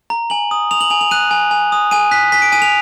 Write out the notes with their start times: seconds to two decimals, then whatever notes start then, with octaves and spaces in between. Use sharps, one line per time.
0.10 A#5
0.30 G#5 F#7
0.51 D#6
0.71 D#6 F7
0.81 F#7
0.90 G#5 F7
1.01 F7
1.11 F#6 D#7
1.31 G#5
1.51 G#5
1.72 D#6
1.91 G#5 D#7
2.11 F#6 B6
2.32 G#5 B6
2.42 D7
2.52 G#5 D#7
2.62 F7